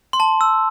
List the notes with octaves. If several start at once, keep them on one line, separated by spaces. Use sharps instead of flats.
C6
A5
E6